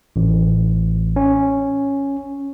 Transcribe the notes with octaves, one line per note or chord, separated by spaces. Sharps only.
A1
C#4